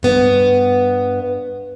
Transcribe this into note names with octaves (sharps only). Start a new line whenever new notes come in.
G2 B3